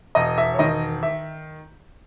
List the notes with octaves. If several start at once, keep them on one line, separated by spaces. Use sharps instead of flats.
E1 D#5
E5
C#5
D#3 D#5
E5